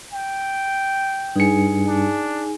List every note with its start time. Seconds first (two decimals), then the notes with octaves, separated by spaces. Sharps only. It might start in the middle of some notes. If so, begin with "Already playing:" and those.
0.12 G5
1.36 G2 D#4 G#4 G#5 C#7
1.86 D4